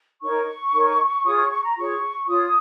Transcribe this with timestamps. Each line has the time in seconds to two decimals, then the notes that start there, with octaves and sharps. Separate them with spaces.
0.22 D#4 A#4 C#5 C#6
0.73 D#4 A#4 C#5
1.25 F4 G#4 C#5 D#6
1.37 C#6
1.50 C#6
1.63 A#5
1.76 F4 G#4 C#5 C#6
2.27 F4 C#5 D#6